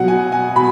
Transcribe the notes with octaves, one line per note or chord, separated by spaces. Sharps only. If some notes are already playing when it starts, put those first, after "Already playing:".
Already playing: B2 F#3 F#5
G#5
G#5
B2 B5